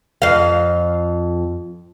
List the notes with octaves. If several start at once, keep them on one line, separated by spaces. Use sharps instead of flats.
F2 F5